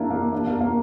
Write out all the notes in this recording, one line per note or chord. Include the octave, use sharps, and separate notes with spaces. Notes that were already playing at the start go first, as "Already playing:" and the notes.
Already playing: A#3 D4 E4
A#3
D4
A#3
A#3